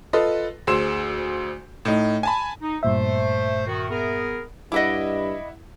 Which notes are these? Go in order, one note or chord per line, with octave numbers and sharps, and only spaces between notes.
F4 A4 B4 D#5
D2 G#4 C5 C6 E6 E7
A2 D#4
G#5 A5 B5
D#4
G2 A#2 A3 C5 E5
D#3 F#4
B3 G#4 A#4
G2 E4 D#5 E5 F#5 B5 D6